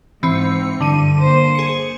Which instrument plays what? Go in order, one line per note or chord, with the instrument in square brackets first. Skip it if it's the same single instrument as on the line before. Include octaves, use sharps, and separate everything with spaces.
[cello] G#2 [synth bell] E3 C4 C#7
[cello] G2 [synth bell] D3 D#7
[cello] A#3 C5
[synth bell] G#4 C#7